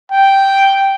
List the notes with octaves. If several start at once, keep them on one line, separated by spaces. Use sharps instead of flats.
G5